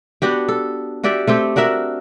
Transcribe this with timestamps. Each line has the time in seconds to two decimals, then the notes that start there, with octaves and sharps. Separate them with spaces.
0.22 B3 D4 F#4 G4
0.48 A4
1.04 F#4 G4 D5 E5
1.27 A3 C4 G4
1.56 D4 F#4 A#4 E5